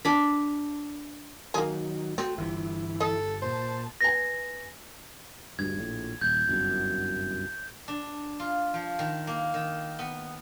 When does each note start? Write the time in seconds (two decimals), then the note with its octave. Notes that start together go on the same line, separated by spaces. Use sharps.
0.05 D4 B5
1.54 D#3 F#3 A#3 G#4
2.18 A3 C4 F#4
2.38 G1 C3 E3 E4
3.00 A4 D#5
3.42 A#2 C5 A5
4.01 B4 G#5 A#6
5.59 D2 G2 G#6
5.79 A#1 A2
6.21 D#1 G6 G#6
6.47 G1 C2 F#2
7.88 D4
8.40 F4
8.74 F3
8.99 D#3
9.27 A#3
9.54 D#3
9.99 B3